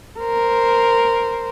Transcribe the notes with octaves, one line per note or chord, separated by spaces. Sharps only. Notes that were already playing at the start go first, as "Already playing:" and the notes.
A#4 C5